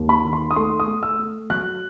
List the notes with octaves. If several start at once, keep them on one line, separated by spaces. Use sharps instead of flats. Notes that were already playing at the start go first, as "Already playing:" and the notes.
Already playing: D#2
B5
D#3
C6
D#6
A3 C6
D#6
A3
E6
A3
F#3 F#6